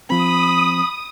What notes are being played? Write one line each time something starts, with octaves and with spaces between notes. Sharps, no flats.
F3 C4 B5 D#6